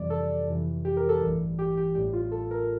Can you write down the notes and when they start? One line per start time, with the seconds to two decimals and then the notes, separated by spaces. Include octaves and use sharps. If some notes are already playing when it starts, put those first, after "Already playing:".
Already playing: F2 C3 E3 G3 D5
0.10 A4
0.48 F2 C3 E3 G3
0.85 G4
0.97 A#4
1.09 A4
1.21 A1 G2 E3 G3
1.59 G4
1.77 G4
1.95 A1 A2 G3 G4
2.13 F4
2.32 A4
2.51 A#4